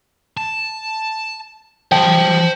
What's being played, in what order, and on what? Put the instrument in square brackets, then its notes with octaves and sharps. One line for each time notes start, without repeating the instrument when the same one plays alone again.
[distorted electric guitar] A5
[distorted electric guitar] E3 G3 [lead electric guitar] C5 A5 [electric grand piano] G5